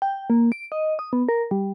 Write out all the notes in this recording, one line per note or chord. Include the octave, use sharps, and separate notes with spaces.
G5
A#3
D7
D#5
D#6
B3
A#4
G3